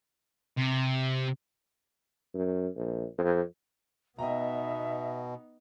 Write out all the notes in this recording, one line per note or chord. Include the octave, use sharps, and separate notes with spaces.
C3
F#2
A#1
F2
B2 B3 D#4 D#5 E5 G5 A#5